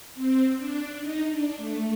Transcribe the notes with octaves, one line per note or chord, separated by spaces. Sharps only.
C4
D4
D#4
D4
A3